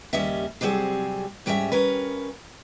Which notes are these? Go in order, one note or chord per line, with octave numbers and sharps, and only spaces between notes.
D#2 C#3 G3 C#4 D#5 E5
C3 F#3 G3 C4 G#4
G#2 G3 C#4 G#4 E5
C#4 A#4 B4